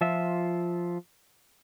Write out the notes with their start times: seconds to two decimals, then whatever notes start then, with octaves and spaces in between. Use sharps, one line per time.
0.01 F3 F4 E5